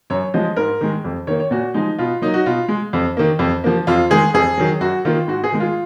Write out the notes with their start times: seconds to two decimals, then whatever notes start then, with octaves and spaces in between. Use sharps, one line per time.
0.10 F#2 C#5
0.34 F3 G#3 D#5
0.56 G#2 A#4
0.81 D#3 G#3
1.04 F2
1.27 D#3 A#3 C#5
1.40 C#5
1.51 A#2 F#4
1.74 F3 G#3 D#4
1.98 B2 F4
2.22 F#3 A#3 D#4
2.34 F#4
2.46 B2 F4
2.68 G#3
2.93 F2
3.17 D#3 A#3
3.39 F2
3.64 F3 A#3
3.87 F2 F4
4.10 D#3 G#3 G#4
4.34 F2 G#4
4.57 D#3 F#3
4.81 F#2 F#4
5.05 D#3 A#3 F4
5.28 G#2 F#4
5.44 G#4
5.52 D#3 G#3
5.60 F4